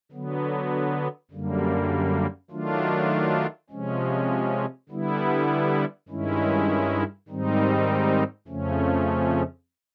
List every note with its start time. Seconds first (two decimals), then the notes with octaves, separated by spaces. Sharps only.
0.12 D3 F#3 B3
1.31 F#2 D3 G3 A#3
2.51 D#3 F#3 A3 D4 F4
3.70 C3 F3 G#3 C#4
4.89 D3 G3 B3 E4
6.09 G2 D#3 G#3 C#4 E4
7.28 G#2 D#3 G3 C4 D#4
8.48 F2 C#3 F3 A3 C#4